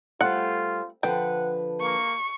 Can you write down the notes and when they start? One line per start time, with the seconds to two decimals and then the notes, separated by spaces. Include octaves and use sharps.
0.21 G3 A3 C4 F4 F#5
1.03 D3 F3 B4 F#5 G5
1.81 A#3 C#6